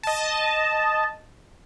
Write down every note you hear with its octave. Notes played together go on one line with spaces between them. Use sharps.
D#5 A5